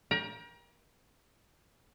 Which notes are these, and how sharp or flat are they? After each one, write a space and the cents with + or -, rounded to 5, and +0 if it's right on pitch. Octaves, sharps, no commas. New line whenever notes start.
A#4 +35 G5 +15 A#5 +35